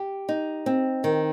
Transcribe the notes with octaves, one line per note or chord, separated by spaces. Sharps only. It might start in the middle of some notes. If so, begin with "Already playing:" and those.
Already playing: G4
D#4
C4
D#3